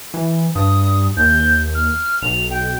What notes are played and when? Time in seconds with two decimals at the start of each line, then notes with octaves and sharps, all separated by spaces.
0.14 E3
0.55 G2 D#6
1.17 D#2 G6
1.75 F6
2.22 B1 F7
2.50 G5